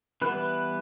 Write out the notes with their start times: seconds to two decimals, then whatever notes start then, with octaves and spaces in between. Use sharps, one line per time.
0.22 E3 G3 B3 B4